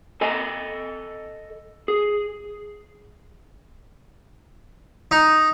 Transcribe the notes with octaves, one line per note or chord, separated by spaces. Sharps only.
A4 D#5 G#5
G#4
D#4